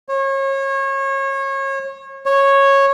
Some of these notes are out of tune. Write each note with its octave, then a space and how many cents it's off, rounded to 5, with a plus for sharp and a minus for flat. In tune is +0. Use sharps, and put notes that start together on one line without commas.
C#5 -30
C#5 -10